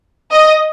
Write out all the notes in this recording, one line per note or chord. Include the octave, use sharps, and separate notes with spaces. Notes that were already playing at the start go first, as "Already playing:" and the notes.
D#5